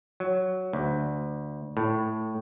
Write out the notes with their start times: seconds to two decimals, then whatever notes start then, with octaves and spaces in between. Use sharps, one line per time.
0.20 F#3
0.73 D2
1.77 A2